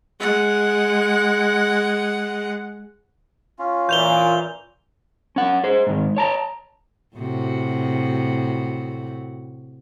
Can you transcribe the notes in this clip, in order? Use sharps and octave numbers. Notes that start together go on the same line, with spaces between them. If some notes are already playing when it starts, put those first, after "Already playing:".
G#3 F#5
C#4 F4
A#2 E3 G6 F7 G7
C#4 F#5
G#4 C5
G#2 D#3
C#5 A5 A#5
A2 C3 F#4